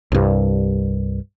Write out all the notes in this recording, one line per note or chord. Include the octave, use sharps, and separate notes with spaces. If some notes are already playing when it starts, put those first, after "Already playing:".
C2 G2